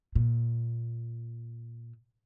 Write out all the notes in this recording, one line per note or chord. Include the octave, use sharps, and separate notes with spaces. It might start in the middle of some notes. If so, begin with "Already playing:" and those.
A#2